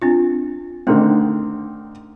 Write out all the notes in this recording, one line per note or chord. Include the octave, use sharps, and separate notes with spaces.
C4 D4 F4
D3 D#3 A3 C4 C#4